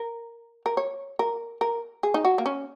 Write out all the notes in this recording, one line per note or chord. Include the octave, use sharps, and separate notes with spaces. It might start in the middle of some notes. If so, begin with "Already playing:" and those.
Already playing: A#4
A#4
C#5
A#4
A#4
G#4
D#4
F#4
A#3
C#4